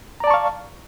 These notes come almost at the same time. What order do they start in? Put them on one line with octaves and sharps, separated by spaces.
A#5 D5 A5 C#6 F5